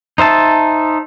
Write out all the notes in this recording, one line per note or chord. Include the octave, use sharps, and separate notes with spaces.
D#4 C5 E5 A5